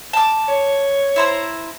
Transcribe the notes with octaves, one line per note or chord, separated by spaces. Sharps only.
A5 D6
C#5
E4 C5 A#5